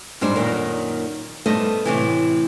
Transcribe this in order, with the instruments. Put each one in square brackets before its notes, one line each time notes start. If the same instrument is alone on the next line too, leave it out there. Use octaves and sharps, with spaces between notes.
[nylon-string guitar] G#2 G3 D4 C5
F#2 A#2 D#3
G2 A3 B3 C5 D#5
A2 C3 E3